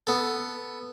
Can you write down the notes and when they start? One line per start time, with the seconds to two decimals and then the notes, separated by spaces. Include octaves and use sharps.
0.07 B3 A4